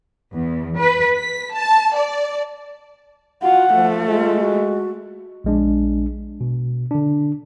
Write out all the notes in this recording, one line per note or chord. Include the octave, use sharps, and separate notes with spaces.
E2
B4
B6
A5
D5
F4 F#4 F#5
F3 A3
G#3 F4
F#4
A#1 G#3 D4
B2
D3 D4